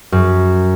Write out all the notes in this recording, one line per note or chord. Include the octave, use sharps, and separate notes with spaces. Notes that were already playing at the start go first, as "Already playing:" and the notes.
F#2